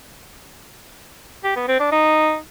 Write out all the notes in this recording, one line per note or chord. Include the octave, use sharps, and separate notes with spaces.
G4
B3
C4
D4
D#4